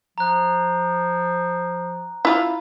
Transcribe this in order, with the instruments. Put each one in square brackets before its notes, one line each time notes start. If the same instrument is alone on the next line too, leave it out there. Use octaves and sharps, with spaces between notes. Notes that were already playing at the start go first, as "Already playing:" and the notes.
[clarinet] F3 [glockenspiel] A#5 F#6
[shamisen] E4 F4